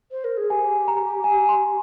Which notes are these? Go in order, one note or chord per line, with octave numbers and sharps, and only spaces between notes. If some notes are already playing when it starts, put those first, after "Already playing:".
C5
A#4
G#4
G4 G#5
A#5
G#5
C6